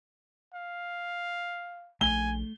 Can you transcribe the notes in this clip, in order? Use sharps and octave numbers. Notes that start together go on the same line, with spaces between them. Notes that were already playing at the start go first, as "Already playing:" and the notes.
F5
A#1 A3 G#5 G7